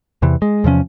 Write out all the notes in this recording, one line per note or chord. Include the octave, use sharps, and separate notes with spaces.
E2 C3 E3
G#3
E2 C3 F3 C#4